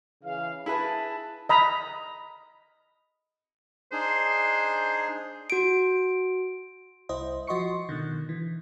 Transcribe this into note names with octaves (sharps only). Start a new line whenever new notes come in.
C#3 E3 F5
E4 G#4 B4 A5
D#5 A#5 B5
D4 D#4 G#4 C5
F#4 D7
C2 E4 C5 D#5
F3 F#4 D#5 C6 C#6 C#7
B2 D3 D#3
E3